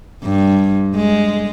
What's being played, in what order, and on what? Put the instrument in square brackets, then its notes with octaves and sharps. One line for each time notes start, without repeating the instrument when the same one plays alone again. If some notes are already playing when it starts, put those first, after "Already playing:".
[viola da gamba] G2
G#3